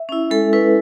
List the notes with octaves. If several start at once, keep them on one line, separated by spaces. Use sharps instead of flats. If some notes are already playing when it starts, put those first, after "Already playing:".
Already playing: E5
C#4 E4
G#3 A4
C#4 E4 B4